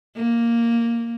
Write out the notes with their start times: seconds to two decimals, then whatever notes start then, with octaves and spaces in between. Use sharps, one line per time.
0.16 A#3